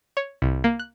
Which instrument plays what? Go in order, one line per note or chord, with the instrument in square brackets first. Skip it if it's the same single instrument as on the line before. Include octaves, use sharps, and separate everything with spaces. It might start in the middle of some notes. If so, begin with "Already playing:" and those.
[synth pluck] C#5
C2
A#3
F#6